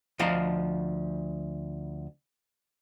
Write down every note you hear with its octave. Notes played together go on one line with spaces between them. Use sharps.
D2 F3 D#5 F5 A#5